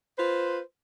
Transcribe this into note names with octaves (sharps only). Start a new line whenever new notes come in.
F4 B4 C5